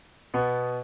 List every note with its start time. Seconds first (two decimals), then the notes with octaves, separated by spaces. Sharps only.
0.34 B2 B3